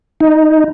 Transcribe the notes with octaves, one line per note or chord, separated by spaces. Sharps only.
D#4